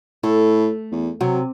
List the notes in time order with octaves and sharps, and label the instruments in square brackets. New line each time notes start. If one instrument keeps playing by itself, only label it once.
[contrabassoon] A2 [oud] A3
[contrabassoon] E2
[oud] C3 [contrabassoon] F#3